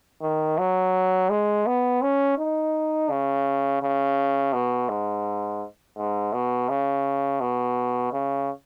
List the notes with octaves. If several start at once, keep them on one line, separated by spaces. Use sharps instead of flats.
D#3
F#3
G#3
B3
C#4
D#4
C#3
C#3
B2
G#2
G#2
B2
C#3
B2
C#3